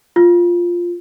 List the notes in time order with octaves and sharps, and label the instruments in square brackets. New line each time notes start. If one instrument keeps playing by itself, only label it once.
[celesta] F4